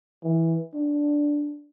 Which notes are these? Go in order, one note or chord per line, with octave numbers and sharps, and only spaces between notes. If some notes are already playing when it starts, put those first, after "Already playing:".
E3
D4